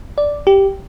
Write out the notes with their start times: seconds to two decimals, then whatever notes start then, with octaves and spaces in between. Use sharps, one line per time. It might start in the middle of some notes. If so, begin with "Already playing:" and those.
0.18 D5
0.47 G4